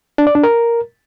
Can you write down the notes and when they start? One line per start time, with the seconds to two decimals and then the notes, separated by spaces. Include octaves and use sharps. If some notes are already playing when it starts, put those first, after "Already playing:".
0.18 D4
0.27 D5
0.35 D4
0.44 A#4